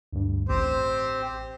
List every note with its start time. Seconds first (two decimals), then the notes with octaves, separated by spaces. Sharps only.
0.12 D2 G2
0.49 A1 C4 G4 C5